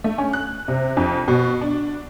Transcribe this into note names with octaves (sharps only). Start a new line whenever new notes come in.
A3
C#4
F#6
C3
F2
B2
D4